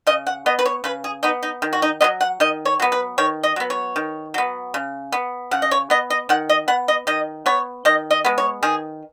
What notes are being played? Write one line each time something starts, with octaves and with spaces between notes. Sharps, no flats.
C#3 D#5
F#5
B3 D#5
B4
C#5
C#3 B4
G#4
B3 D#4
D#4
D#3
F#4
D#4
F#3 B3 D#5
F#5
D#3 D#5
C#5
F#3 B3
B4
D#3 C#5
D#5
F#3 B3
C#5
D#3
F#3 B3
C#3
B3
C#3 F#5
D#5
C#5
B3 D#5
D#5
D#3 F#5
D#5
B3 F#5
D#5
D#3 D#5
B3 C#5
D#3 D#5
D#5
G#3 B3
C#5
D#3 G#4